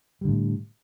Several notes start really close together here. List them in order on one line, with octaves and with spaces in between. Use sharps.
G3 D3 A2